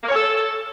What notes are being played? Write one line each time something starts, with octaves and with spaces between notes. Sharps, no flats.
A#3
C#5
A4